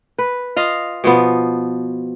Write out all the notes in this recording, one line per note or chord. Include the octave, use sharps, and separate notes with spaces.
B4
F4 D#5 F5
B2 F3 B3